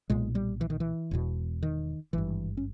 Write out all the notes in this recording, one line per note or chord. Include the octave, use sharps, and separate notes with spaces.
B1 A#2 G#3
G3
E3
D#3
E3
E1 E2 B2
D#3
G#1 G2 E3
C#4